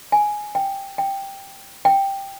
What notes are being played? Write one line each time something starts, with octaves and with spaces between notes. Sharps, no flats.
G#5
G5
G5
G5